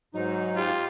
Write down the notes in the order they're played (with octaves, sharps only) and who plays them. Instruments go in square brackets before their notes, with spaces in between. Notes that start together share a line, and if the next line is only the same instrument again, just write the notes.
[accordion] G#2 D#4 [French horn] F#3
[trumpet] F4 [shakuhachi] G4